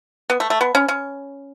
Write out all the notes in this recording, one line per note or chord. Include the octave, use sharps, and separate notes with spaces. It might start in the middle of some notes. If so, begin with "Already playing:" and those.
B3
A3
A3
B3
C#4
C#4